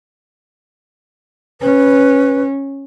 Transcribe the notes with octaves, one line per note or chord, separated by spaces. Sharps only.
C#4 B4